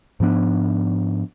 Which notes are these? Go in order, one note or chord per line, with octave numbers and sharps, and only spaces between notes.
G#2 F3 B3 D4